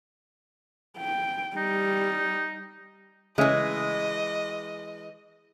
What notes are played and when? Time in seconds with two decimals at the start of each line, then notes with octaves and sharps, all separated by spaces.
0.98 G5
1.57 G3 D#4
3.38 C#3 E3 G#3 A3 C#4 D#5